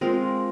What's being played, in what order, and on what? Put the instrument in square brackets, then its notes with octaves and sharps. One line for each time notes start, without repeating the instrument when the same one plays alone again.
[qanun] G#3 C4 F4 A#4